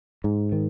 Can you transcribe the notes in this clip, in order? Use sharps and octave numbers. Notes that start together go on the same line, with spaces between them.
G#2
D#3